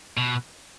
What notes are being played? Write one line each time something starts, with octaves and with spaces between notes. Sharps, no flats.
B2